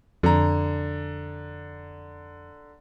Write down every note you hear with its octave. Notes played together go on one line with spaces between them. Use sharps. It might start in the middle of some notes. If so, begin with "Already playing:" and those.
F2 D3 A#5